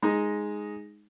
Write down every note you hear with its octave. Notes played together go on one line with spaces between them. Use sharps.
G#3 D#4